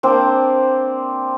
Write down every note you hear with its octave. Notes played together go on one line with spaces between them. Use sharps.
A#3 C4 D4 C5